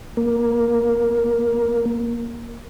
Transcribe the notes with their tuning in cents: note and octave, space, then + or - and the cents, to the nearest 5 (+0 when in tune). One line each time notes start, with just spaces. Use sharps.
A#3 +10